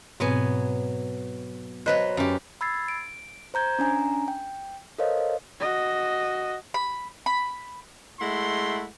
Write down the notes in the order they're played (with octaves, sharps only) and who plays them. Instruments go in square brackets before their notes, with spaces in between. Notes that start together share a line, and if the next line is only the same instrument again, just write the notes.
[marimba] G#2 B2 C4 [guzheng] F#3 B3 G#5
[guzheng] F#3 B4 C5 [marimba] D#5 F#6
[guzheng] F#2 G4
[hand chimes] B5 E6 G#6 A6 C7
D7
C5 A#5 G6 G#6
C#4 D4 G#5 A#5
G5
A4 A#4 C5 C#5 D#5 F5
[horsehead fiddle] F#4 D#5
[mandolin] B5
B5
[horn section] G#3 A3 E4 F#5 C6